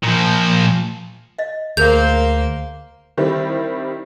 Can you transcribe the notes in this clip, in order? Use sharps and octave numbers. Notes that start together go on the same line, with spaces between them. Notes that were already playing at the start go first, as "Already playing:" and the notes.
A#2 F3
D#5 F5
D2 A#3 G#4 A#4 C5 F5 G6 F7
D#3 G3 C4 E4